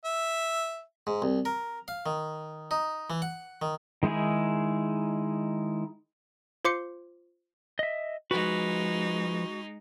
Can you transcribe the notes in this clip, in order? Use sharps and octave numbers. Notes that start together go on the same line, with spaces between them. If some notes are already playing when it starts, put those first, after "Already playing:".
E5
G#2
C2
A#4
F5
D#3
D#4
E3
F#5
D#3
D#3 G#3 D#4 E4 G#4
F4 C5 C6 D6 C7 C#7
D#5 E5
F3 G#3 D#4 F#4 B4